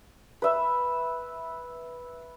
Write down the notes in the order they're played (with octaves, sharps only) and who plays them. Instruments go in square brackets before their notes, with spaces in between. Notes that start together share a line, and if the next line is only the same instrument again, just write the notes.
[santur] B4 E5